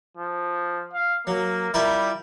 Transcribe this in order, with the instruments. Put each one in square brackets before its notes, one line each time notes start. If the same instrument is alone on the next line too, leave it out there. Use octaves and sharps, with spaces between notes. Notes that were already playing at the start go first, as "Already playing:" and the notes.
[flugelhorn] F3
F5
[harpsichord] F#3 [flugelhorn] A#3
[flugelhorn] G3 [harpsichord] E4 F4 A#4